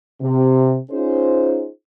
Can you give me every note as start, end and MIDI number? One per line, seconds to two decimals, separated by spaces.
0.21 0.76 48
0.91 1.68 61
0.91 1.68 63
0.91 1.68 65
0.91 1.68 68
0.91 1.68 72